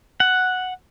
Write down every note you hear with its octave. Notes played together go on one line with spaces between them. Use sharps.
F#5